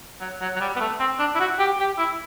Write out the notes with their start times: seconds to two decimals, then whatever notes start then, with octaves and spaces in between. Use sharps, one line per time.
0.20 F#3
0.41 F#3
0.56 F#3
0.60 G3
0.76 B3
0.81 A3
0.99 C4
1.19 D4
1.35 E4
1.40 F#4
1.59 G4
1.79 G4
1.98 E4